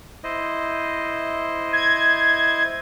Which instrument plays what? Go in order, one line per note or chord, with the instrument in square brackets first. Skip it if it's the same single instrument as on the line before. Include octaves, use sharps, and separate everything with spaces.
[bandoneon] E4 C5 D#5
[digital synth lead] G#6